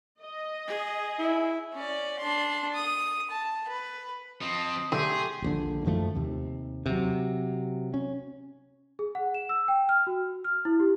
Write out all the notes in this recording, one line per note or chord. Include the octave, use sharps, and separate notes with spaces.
D#5
G#4 G#5
E4
C#4 D5
D4 C6
D#6
A5
B4
F3 C4 D#5
D3 A3 G4 G#4 C6
D#1 A#1 D3
F#2 D#3 F3 A3
D#2 C3
C3 F#3
C#4
G#4
F#5
E7
E6
G5
F6
F#4
F6
E4
G4